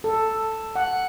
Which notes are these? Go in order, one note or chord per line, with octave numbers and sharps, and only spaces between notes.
A4
F#5